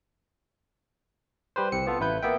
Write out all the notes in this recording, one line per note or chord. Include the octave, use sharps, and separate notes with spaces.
G3 G4 B4 C5
C2 C4 C#7
B3 F4 A4
A1 E4 B4 G6
A#3 B3 E5 G5